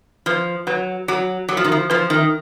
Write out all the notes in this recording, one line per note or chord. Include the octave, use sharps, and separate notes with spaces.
F3 B4
F#3 B4
F#3 F#4
F#3 F#4
F3
D#3
F3
F3 B4
D#3